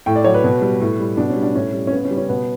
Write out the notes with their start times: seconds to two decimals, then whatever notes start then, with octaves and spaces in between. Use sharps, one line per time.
0.06 A2 G5
0.16 D5
0.24 F#3 C#5
0.34 B4
0.44 B2
0.62 G3
0.81 A2
1.00 G3
1.17 B2 D4
1.30 C#4
1.36 G3
1.43 D4
1.55 A2 C#4
1.74 G3
1.87 C#4
1.92 C#3 B3
2.05 C#4
2.11 G3
2.17 C#4
2.29 B2 B3